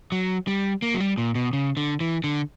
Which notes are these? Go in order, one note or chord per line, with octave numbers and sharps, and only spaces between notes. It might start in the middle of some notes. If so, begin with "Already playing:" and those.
F#3
G3
A#3
F#3
G3
A#2
B2
C#3
D3
E3
D3